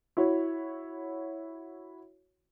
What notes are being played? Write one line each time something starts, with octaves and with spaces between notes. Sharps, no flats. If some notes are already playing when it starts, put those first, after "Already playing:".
E4 F#4 C#5